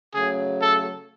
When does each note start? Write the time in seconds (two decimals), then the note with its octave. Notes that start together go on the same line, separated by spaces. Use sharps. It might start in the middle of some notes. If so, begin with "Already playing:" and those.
0.14 C#3 F#3 A3 G#4
0.61 A4